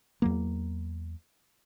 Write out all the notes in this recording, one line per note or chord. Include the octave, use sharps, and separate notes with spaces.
E2 F#3 A#3